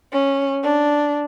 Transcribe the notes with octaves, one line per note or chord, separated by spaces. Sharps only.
C#4
D4